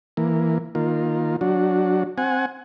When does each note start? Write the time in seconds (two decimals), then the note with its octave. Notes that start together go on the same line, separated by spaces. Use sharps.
0.17 E3 A#3
0.75 D#3 A#3 F4
1.41 F#3 D4 F#4
2.18 C4 F#5 G#5